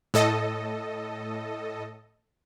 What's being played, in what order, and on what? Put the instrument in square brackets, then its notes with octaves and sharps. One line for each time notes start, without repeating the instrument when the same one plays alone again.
[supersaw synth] A2 A4 D#5